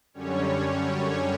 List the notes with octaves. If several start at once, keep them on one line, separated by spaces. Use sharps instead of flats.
F#2 D3 G3 C#4 C#5